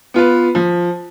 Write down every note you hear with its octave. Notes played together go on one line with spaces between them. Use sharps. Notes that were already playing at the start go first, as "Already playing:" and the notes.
B3 F4 B4
F3